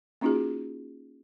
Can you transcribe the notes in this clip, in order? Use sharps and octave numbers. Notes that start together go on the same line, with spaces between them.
A#3 C#4 D#4 F4 F#4 G#4